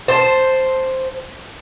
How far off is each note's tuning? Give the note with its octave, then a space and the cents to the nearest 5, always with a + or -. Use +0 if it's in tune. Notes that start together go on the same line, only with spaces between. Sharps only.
C5 +0 A5 +0